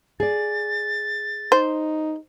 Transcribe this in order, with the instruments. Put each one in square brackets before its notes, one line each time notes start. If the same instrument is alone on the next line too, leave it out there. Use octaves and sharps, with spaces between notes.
[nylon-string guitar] G#4 D5 [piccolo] A6
[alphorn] D#4 [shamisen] C5